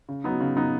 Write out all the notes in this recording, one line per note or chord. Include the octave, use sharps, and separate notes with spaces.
C#3
F#3 B3 D#4
C#3
F#3 B3 D#4